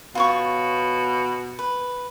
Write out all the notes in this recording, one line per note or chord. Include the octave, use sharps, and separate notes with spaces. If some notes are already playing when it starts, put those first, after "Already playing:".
B2 F4 C#5 C#6
B4